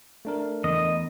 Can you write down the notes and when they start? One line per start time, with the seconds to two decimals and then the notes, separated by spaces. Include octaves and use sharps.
0.25 A3 D4 A#4
0.64 E2 D#5